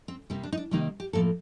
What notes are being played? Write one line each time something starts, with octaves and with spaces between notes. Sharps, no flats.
C4
C3 G3 A#3 C4
D4
D#4
D4
C3 D#3 G3 A#3 D#4
G4
A2 F3 A#3 A4